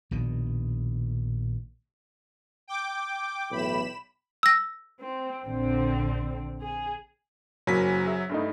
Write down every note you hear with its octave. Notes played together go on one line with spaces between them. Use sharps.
A#1 B2 D#3
G5 D6
B1 E2 A2 B5 E7
E6 A#6
C4
A#1 D3 C4
G#4
F#1 F#3 A#3 G#5 B6
G#4 E5
G2 A3 D#4